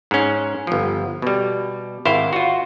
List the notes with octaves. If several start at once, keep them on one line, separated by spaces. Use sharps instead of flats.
G#2 C#4
G1 F3
B2 G3
G#1 E4 C5 F5
F4 F#4